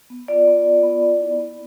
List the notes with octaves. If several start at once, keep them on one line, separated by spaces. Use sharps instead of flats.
B3
F4 D5
B3
F4
B3
B3
E4
B3